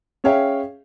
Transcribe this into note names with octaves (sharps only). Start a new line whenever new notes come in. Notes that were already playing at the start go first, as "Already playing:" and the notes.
C#4 G#4 C#5 E5 F5 G5